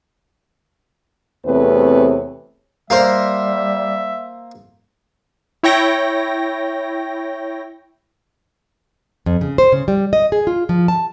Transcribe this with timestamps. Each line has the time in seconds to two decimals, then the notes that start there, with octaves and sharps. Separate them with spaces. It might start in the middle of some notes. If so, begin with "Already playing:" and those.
1.46 E2 C3 A3 C4 B4 C#5
2.90 G3 A#3 A#4 C5 E5
5.63 E4 C#5 G5 A#6
9.26 F2
9.41 C#3
9.58 C5
9.72 C#3
9.88 G3
10.13 D#5
10.32 G#4
10.47 F4
10.69 F3
10.88 A5